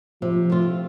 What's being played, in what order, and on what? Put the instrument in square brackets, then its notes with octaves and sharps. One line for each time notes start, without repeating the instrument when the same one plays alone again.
[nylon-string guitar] C3 [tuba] F3
[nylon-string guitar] A3 C4 F4